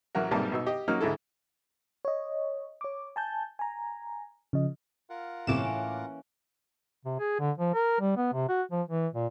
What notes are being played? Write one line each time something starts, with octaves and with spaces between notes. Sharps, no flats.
A1 F#3 F#4 A#4
B1 G#2 C3 G3 A#3 A5
B2 D#4 E6
G4 D#5
F#3 A#3 C#4 D#4 F#4 F6
D2 G#2 G#3 E4 A4
C#5 D#5
C#5 D6
G#5 A5 G6
G#5 A#5
C#3 F3 D#5
F4 A#4 F#5
G1 A2 C3 E3 A#3 C#4 D6 E7
C3
G#4
D3
F3
A#4
G3
B3
C3
F#4
F3
E3
A#2